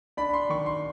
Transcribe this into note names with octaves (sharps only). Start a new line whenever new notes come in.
D4 B5
B5
C6
D#3 C#6
C6